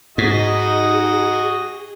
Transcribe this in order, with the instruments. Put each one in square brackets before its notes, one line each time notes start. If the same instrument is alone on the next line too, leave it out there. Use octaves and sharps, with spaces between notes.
[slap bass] G#2 [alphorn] D#4 [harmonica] F#4 D#5 [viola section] G#4